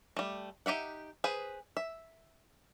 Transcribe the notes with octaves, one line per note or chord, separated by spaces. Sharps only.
G3 A3
D#4 G4 E5 F#5
G#4 B4 C5
E5